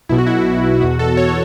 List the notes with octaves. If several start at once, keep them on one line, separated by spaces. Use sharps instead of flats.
B1 B2 E4
F#4
E4
E2 B2 F#4
A4
C#5